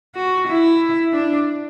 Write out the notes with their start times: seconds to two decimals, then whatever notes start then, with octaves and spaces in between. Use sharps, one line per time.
0.15 F#4
0.47 E4
1.13 D4